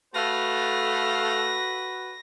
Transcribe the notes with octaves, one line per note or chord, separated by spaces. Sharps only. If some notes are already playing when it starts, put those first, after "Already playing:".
A3 F#4 A4 B4 F5 A#6